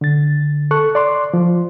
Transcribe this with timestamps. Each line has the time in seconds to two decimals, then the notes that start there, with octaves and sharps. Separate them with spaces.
0.01 D3 A6
0.71 A4 C#6 F#6
0.95 D5 C6 D6
1.34 F3